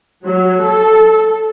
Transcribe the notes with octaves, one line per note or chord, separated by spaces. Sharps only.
F#3
A4